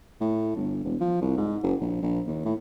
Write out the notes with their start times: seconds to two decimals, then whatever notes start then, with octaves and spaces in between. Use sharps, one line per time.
0.21 A2
0.56 G1
0.84 E1
1.01 F3
1.21 C2
1.37 G#2
1.63 F#1
1.81 A#1
2.02 A#1
2.27 D#2
2.45 A2